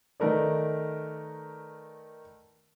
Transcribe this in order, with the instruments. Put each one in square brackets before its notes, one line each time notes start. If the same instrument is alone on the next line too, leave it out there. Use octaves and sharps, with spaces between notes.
[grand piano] D#3 A3 A#4 B4 D5